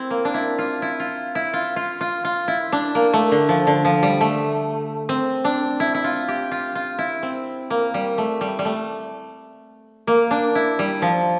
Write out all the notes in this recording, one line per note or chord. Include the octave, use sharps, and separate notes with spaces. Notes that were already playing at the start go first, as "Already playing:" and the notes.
Already playing: C4 E4
A#3
D4
E4
F4
E4
F4
E4
F4
F4
F4
F4
E4
D4
A#3
A3
D3
F3
D3
F3
G3
A3
C4
D4
E4
E4
F4
G4
F4
F4
E4
C4
A#3
G3
A3
G3
G3
A3
A#3
D4
E4
G3
F3